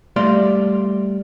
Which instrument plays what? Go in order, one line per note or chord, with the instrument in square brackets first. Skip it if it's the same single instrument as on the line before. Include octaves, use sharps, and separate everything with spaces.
[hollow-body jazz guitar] G3 A3 D5 F5 C6